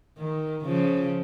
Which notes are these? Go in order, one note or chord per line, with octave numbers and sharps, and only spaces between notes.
D#3
C#3 F3